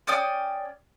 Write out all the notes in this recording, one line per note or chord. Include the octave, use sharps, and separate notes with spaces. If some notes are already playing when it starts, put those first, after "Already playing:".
C#4 D5 G5 D#6